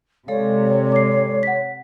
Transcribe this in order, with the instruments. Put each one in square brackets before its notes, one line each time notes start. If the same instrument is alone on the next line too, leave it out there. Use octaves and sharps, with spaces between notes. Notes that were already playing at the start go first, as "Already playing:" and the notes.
[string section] C3 [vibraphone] G#3 A4 D5 [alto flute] C#5 [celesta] F5
[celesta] D6 C7
F#5 B6